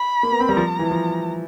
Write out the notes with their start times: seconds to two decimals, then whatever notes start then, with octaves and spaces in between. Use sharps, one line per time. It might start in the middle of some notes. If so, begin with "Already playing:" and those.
Already playing: B5
0.23 A#3
0.32 B3
0.40 C4
0.49 G3
0.57 F3 A#5
0.79 E3
0.91 F3